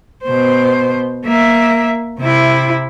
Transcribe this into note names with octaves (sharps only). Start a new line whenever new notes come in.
B2 C5
A#3 E5
C3 E4